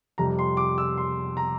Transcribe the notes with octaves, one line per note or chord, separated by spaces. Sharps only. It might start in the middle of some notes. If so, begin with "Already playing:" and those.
F2 C3 G3 A#5
C6
D6
E6
C6
A#5